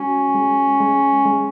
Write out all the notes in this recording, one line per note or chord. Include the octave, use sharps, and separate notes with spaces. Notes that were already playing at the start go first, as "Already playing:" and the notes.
Already playing: G#3 C#4 F#4
G#3
G#3
G#3